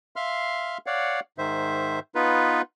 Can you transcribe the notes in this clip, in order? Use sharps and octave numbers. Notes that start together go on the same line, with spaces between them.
E5 F5 C6 F6
C#5 D5 F5 F#5
G#2 D#3 C5 E5
B3 D#4 F4 B4